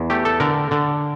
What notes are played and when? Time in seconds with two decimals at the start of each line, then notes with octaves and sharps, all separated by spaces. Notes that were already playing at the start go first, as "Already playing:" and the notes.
Already playing: E2
0.10 A3 G4
0.25 A4
0.40 D3 A#4
0.71 D3